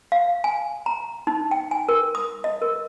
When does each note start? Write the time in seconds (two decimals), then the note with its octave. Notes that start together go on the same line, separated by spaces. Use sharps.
0.12 F5
0.44 G#5
0.86 A#5
1.27 D#4
1.51 G5
1.71 G#5
1.89 A#4
2.15 D#6
2.44 D#5
2.62 A#4